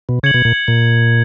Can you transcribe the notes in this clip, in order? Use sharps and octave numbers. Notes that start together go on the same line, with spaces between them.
B2
C#3 G#6 C#7 F#7
B2
A#2
A#2